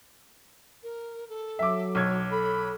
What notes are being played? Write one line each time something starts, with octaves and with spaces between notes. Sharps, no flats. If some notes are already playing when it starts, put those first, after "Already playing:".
A#4
A4
F#3 E5 D6
B1 C#5 G#6
A4 B5